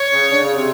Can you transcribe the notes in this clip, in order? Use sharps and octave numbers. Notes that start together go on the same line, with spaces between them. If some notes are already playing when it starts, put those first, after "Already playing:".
Already playing: C#5
C#3
D3
C#3
C3